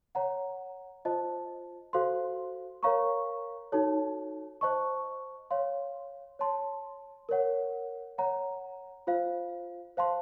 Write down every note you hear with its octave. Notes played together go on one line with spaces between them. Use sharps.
C#5 F#5 A#5
F4 C5 D#5 A5
F#4 A4 C5 F5 C6
A#4 C#5 F5 A#5 C#6
D#4 F#4 A4 C#5 A5
C5 D#5 A5 C#6
C#5 F5 C6
C#5 A5 C6
A#4 C#5 F#5
C#5 F#5 A#5
F4 C5 F5
C5 F5 A5 C6